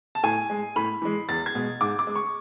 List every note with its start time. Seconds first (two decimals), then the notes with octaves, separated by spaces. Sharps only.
0.15 A5
0.23 A2 G#5
0.50 G#3
0.76 A2 B5
1.02 E3 G#3
1.29 E2 A6
1.46 G#6
1.55 B2 G#3
1.81 G#2 D6
1.99 D6
2.07 G#3
2.16 C#6